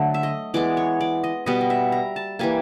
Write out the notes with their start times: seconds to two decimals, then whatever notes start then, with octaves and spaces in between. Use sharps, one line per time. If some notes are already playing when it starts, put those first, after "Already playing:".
Already playing: D3 F#3 A3
0.14 E5
0.23 D#5
0.54 E3 G#3 B3 D5
0.77 C#5
1.01 D5
1.24 D#5
1.46 B2 G3 B3 D#5
1.61 D#5
1.70 E5
1.92 A#5
2.16 A5
2.39 E3 G3 A#3 G#5